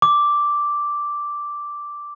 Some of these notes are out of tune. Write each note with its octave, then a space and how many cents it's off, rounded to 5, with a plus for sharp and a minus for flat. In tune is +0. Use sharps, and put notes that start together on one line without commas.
D6 -5